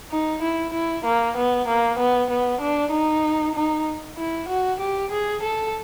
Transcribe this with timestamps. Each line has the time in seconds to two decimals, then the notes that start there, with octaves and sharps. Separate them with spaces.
0.11 D#4
0.42 E4
0.73 E4
1.05 A#3
1.37 B3
1.68 A#3
1.99 B3
2.30 B3
2.61 D4
2.92 D#4
3.55 D#4
4.17 E4
4.48 F#4
4.80 G4
5.12 G#4
5.43 A4